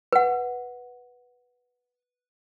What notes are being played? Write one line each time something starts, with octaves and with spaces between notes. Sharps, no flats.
B4 F#5